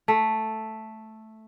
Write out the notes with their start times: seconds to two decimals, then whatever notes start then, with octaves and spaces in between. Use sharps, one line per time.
0.08 A3